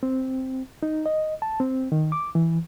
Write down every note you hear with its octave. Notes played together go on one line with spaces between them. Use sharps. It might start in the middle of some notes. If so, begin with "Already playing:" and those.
C4
D#4
D#5
A5
C4
D#3
D6
E3